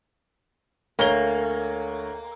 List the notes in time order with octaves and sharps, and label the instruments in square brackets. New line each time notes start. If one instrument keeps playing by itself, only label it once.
[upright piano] D2 C#5 G7 [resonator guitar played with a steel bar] A#3